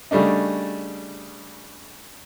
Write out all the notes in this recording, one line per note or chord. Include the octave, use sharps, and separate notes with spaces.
C#3 G3 A3 D4 D#4